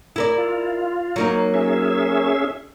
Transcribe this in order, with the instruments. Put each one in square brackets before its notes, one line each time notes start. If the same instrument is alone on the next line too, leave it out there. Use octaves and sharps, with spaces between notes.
[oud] E4 A#4 D5
[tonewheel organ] F4
[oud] F#3 A#3 D#4
[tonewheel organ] C#4 G#4 E5